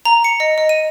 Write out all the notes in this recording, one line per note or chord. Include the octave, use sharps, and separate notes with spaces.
A#5
C#7
D#5
D#5
D#7